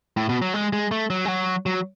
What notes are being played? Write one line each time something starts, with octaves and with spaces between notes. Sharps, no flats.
A2
B2
F#3
G#3
G#3
A3
F#3
G#3
F#3
F#3